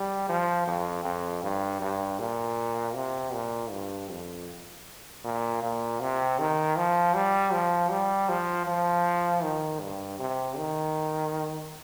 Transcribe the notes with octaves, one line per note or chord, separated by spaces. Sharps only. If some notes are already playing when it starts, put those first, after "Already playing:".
Already playing: G3
F3
F2
F2
G2
G2
A#2
C3
A#2
G2
F2
A#2
A#2
C3
D#3
F3
G3
F3
G3
F3
F3
D#3
G2
C3
D#3